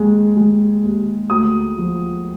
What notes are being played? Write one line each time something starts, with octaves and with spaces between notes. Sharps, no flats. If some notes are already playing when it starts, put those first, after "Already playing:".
Already playing: D#2 G#3
G#3
D#2
D2 D#6
F3